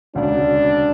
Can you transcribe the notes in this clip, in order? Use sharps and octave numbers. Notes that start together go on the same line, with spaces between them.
E1 D2 C#3 D4